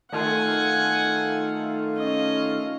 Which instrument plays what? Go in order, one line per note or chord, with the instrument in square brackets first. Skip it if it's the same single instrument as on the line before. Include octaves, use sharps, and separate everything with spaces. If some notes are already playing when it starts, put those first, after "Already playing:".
[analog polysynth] D#3 A3 F4 [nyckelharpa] F#5 G#5
[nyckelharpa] C#4 D#5